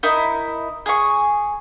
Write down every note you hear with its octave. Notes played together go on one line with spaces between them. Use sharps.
D#4 E4 A#4
G#4 C#6